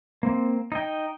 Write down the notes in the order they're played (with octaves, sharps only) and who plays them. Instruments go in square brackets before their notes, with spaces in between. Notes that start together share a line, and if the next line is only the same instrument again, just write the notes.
[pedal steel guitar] A#3 C4
D#4 D#5 G5